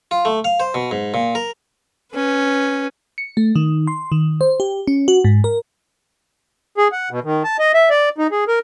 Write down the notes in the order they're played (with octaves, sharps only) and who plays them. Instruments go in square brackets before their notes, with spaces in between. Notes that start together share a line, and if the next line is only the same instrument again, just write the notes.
[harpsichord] F4
A3
F5
C5
B2
G#2
A#2
A#4
[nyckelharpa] C#4 B4
[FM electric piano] C#7
A3
D#3
C6
D#3
C5
G4
C#4
F#4
G#2
A#4
[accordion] G#4
F#5
B2
D#3
A5
D#5
E5
D5
D#4
G#4
A#4